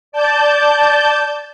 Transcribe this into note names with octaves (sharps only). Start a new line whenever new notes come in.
D5 A5 G6